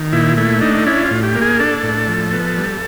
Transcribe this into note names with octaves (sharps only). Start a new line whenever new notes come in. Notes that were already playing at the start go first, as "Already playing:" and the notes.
Already playing: D#3
A#2 E4
A3 E4
D4 D#4
C#4 E4
F4
A2
G4
A#3
G#4
D4 A4
A2
F3
B3
G3